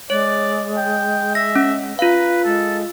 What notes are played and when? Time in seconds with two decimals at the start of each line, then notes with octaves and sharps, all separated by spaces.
0.10 G#3 C#5 D5
0.76 G5
1.35 E5 A#6
1.56 C#4
1.99 F4 B4 F5
2.45 G#3 A4